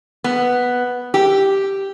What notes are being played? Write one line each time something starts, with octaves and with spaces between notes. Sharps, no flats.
B3
G4